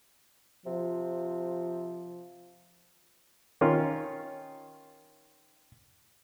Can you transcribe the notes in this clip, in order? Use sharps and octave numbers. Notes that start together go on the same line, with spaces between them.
C3 F3
D#3 C#4 F4